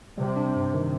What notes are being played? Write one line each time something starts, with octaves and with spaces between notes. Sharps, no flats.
C3 G3
D4
G2
D#3